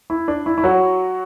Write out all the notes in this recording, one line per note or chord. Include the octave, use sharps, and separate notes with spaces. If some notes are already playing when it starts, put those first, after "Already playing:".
E4
D4
E4
E4
F#3 F#4